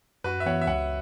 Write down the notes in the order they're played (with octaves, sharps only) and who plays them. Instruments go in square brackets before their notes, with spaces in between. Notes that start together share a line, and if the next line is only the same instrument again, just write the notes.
[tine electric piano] F#2 [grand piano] F#4 B4
[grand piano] E5
[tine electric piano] E3 B3 [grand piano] C#5 F#5
[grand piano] E5
[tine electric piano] C#2 [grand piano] C#5 F#5